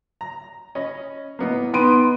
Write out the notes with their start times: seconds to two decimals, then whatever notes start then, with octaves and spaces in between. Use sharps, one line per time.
0.21 A#5
0.75 C#4 D#5 B5
1.39 A2 A#3 B3 D#4
1.74 B3 D#4 G5 C6 D7 D#7